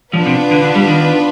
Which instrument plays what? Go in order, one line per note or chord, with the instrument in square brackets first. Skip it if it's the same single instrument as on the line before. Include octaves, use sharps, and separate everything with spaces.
[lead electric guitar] F3 [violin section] B3 D4 F4 B4
[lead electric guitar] C3
D3
D3
G3
D#3